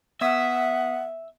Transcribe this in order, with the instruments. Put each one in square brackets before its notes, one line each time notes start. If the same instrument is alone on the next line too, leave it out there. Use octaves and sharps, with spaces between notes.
[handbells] B3 D#6 B6 [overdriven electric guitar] E5 [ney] F#5